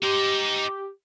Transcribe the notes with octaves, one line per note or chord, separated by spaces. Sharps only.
D#4 G4 C5